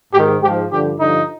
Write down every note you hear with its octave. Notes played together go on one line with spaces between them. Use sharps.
G#2 D#3 G4
G#2 F3 G4
G2 D3 F3 G4
G2 D3 F3 D#4